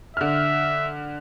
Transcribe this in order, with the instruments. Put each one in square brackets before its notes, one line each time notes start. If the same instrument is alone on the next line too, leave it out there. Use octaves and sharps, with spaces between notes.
[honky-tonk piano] D3 F6 [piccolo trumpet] E5